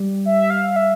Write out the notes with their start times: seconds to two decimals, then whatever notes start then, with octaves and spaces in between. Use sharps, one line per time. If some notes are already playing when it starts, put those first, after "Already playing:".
Already playing: G3
0.25 E5
0.50 F5
0.76 E5